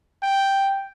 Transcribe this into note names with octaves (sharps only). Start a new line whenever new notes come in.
G5